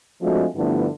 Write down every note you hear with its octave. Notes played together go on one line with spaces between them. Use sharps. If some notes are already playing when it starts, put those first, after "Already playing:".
F3 G#3 A3 C4 D4 F#4
G2 D3 F3 A3 B3 E4